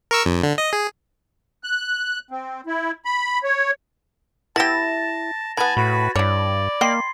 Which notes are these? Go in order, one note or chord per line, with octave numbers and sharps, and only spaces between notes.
A#4 C#6 E6
F2
D3
D#5
G#4
F#6
C4
E4
B5
C#5
B3 E4 G4 A5 A6 A#6 E7
E3 B3 G#5 A5 B5 G#6 A6
A2 F#4 B4
G2 E4 C#5 D5
A#3 D#5 G5 C6 C7